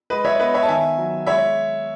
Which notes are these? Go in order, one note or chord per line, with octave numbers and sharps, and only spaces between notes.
G#3 B4 D#5
C#5 E5
B3 B4 D#5
C#5 E5
A5
D#3 E5 G#5
F#3
G#3 C#5 E5